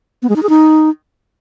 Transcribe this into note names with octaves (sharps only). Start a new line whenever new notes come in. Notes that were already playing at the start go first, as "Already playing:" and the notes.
B3
G#3
D#4
G#4
D#4